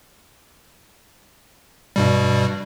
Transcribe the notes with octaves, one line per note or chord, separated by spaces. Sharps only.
G2 B2 G3